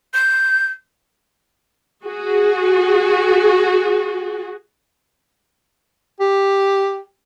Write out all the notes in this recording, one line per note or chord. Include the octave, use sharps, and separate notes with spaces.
G6
F#4 G#4
G4